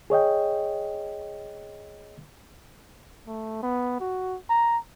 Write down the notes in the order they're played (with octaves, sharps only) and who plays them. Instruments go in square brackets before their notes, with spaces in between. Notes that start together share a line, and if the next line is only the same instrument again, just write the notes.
[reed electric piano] G#4 C#5 D#5 G5
[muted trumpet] A3
B3
F#4
A#5